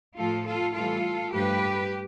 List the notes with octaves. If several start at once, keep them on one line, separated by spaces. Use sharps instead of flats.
A2 F3 A3 F4 A4
F4 A4
A2 E3 G3 F4 A4
G2 F3 A3 G4 B4